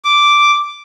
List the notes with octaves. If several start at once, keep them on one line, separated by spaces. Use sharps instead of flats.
D6